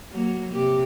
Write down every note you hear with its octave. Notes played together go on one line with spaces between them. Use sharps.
F#3 A#3
C3 G4